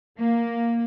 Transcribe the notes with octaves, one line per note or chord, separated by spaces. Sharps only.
A#3